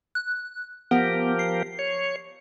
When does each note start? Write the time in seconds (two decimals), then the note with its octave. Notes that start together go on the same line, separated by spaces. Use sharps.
0.15 F#6
0.91 F3 B3 G4 A#4
1.39 C7
1.79 C#5